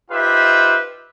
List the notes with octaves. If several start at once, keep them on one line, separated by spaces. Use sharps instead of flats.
D#4 F4 G4 B4 C5 E5